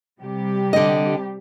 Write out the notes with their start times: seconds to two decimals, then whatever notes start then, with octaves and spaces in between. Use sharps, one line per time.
0.21 C3 G3 G4
0.73 D3 D#5